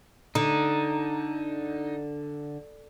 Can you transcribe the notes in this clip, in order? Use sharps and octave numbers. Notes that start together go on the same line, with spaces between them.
D3 D#4